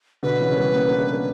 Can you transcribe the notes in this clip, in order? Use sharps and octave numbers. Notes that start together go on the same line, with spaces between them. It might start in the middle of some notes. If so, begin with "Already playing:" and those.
B2 D3 B4
C#3 E3
C#4
G3 B3
A#3 C#4
B3 D4
E4
B3 D4
B3 D4